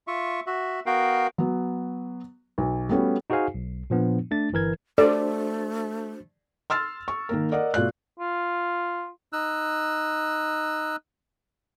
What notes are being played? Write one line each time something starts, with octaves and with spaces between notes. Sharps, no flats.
F4 E5 C#6
F#4 E5
B3 F#4 A#4 F5 G5
F#3 B3
B1
G3 A3 B3 C#4 F#4
D#4 F#4 G#4 C5 F5 G#5
B1
A#2 F3 B3 D4
A3 D4 A6
G1 E3 A#4 G#6
A3 D4 F#4 A4 C5 D5
C6 E6 F6 A6
C#6
D#3 A#3 A#4
A#4 D5 D#5 F#5
B2 A3 F4 D5 F#6
F4
D#4 E6 F#6